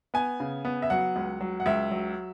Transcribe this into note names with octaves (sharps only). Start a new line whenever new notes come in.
B3 G#5
C#3
B3
E5
F#3 F#5
C#2
F#3
F#5
C#2 E5
F#3